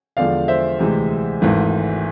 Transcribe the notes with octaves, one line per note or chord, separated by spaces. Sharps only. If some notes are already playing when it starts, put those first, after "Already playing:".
E2 D3 F3 G#3 D5 F5
C5 E5
D2 C3 E3 G#3
G#1 G#2 E3 A3